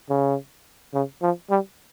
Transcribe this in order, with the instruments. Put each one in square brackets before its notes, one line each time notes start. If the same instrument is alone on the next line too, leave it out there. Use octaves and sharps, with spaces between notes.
[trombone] C#3
C#3
F3
G3